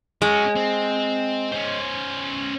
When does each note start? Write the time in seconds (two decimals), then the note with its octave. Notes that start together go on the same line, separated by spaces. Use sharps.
0.22 G#3 C#4 F#4
0.56 C4
1.52 C#4 C5